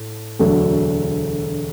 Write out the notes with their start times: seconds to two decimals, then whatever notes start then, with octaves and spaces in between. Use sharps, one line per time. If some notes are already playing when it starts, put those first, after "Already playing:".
Already playing: A2
0.39 E1 D2 D3 F#3